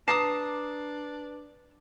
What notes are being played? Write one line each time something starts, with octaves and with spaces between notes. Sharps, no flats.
D4 B4 A5 A#5 D6 D#6 C7